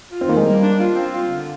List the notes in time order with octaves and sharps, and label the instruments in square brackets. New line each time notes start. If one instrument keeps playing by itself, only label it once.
[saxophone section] F4
[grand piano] C4
[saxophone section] D#3 [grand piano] A#3
[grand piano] G#3
[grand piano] G3 [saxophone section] A#3
[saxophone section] D4
F4
C4
F4
D3